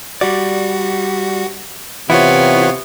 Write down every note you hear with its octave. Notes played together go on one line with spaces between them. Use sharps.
G3 F#4 D5
C3 E3 B3 E4 F4 C#5